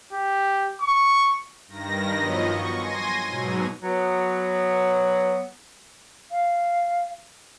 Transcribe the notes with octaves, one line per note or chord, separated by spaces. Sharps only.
G4
C#6
G2 D#3 A#6
F3 F#3 B3 D#5
C#6
G#5 C6 A#6 D#7
G#2 B2 F#3
F#3 B3
F5